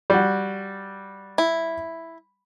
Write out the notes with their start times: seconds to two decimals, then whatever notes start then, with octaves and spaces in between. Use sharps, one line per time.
0.10 G3 F#4
1.38 E4